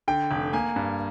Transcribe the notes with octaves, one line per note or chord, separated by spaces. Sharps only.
D3 G5
F1
A#3 G#5
G2